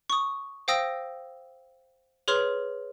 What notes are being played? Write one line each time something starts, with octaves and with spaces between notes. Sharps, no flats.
C#6 D#6
C5 F5 G5 D#6 E6 A#6
G#4 B4 C#5 C6 F6 F7